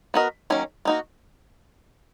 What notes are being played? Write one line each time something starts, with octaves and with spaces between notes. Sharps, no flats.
B3 F#4 A#4 D#5
D#3 F#3 A#3 C#4
A#3 D#4 F#4